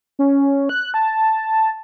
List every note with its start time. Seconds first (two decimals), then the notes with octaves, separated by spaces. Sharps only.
0.19 C#4
0.69 F#6
0.94 A5